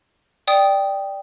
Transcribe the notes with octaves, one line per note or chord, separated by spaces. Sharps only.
D5 G5 D#6